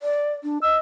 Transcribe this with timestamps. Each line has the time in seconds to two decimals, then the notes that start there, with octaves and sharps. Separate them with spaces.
0.01 D5
0.43 D4
0.62 D#5 E6